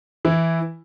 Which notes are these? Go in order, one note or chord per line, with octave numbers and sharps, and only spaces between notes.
E3 E4